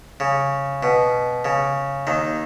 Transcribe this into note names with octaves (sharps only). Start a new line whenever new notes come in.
C#3
B2
C#3
D#2 D#3